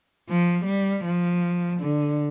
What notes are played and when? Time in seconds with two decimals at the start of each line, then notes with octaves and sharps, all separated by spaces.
0.28 F3
0.66 G3
1.04 F3
1.80 D3